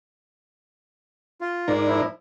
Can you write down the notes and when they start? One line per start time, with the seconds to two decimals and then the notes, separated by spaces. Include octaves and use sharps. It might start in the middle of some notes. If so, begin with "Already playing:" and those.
1.41 F4
1.68 G#2 D#4 A#4 D5
1.87 F3 E4